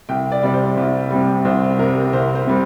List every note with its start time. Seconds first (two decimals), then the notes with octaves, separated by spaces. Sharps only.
0.09 C2 G5
0.32 D5
0.43 C3 G3 D5
0.54 C5
0.77 C2
1.11 C3 G3
1.45 C2 C5
1.79 C3 G3 A#4
2.13 C2 C5
2.35 C5
2.47 C3 G3